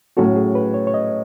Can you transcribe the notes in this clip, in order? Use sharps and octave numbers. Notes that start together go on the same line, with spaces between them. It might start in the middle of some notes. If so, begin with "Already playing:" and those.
A2 F#3 C#4 F#4 A4
G#4
B4
C#5
C#5
D#5